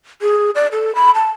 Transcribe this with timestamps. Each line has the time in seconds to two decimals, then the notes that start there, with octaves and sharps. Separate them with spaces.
0.22 G#4
0.55 D5
0.72 A4
0.95 B5
1.15 A5